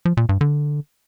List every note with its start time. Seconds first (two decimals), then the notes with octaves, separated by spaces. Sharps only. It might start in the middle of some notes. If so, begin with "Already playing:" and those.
0.05 F3
0.17 A#2
0.29 G2
0.41 D3